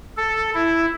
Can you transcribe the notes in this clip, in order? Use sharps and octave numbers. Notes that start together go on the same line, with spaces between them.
A4
E4